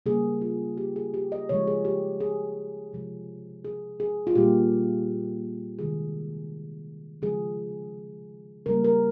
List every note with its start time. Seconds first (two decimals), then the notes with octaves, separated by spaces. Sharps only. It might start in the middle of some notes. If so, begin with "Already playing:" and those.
0.06 C#3 G3 A#3 G#4
0.41 F4
0.77 G4
0.96 G#4
1.14 G4
1.32 D#5
1.49 C#3 F3 G#3 C#5
1.67 G#4
1.85 G4
2.20 G#4
2.93 C3 F3 G#3
3.65 G#4
4.00 G#4
4.27 F4
4.35 A#2 G3 A#3 G4
5.79 C3 D#3 G#3 G#4
7.22 C#3 F3 G#3 G#4
8.66 C#3 G3 A#3 A#4
8.84 A#4